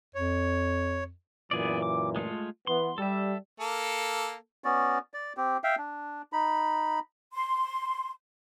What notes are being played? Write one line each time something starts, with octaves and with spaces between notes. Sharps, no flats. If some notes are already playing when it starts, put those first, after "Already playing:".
F2 C#5
F#2 A#2 E3 B3 G#4 D5
D6
G#3 A3 F4
E3 B3 C6
G3 A4 E5
A#3 A4
B3 C#4 F#4 D5
D5
C4 G4
E5 F5 G5
D4
D#4 B5
C6